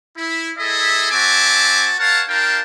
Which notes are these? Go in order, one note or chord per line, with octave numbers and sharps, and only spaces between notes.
E4
E4 G#4 A4 D#5 E5
C4 F#4 E5 G#5 A5 D6
A#4 C#5 F5 F#5 A5
D4 F4 A#4 F5 G5 A5